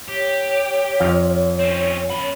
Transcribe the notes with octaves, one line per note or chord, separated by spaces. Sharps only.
G4 C#5
F2 F3 F5
C4 C#4
F#2 B5